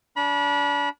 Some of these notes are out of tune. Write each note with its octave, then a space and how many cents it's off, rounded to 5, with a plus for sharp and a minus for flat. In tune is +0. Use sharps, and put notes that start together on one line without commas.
D4 -30 B5 -30